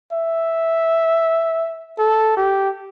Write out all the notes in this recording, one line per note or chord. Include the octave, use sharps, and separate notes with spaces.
E5
A4
G4